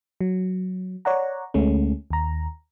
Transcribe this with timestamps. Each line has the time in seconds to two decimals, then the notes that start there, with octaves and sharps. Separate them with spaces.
0.21 F#3
1.05 C#5 D5 F#5 A#5
1.54 D2 G#3 A3 C#4
2.11 D#2 A#5